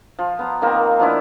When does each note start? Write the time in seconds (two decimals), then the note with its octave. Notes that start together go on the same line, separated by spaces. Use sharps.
0.19 F3
0.39 B3 A#5
0.62 D#3 F3 A#3 C4
0.99 F3 B3 D4 E4